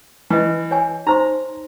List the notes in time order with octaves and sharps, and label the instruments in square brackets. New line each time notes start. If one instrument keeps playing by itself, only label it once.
[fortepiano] E3 [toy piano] B4 D#5
[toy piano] C#5 G#5
[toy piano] D#4 C5 C6 [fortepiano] A#5